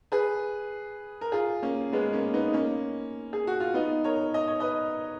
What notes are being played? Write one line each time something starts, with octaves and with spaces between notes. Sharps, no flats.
G#4 B4
A#4
F4 G#4
A#3 C#4
G#3 B3
A#3 C#4
B3 D#4
A#3 C#4
G#4
F#4
F4
B3 D#4
A#4 C#5
D#5
C#5
B4 D#5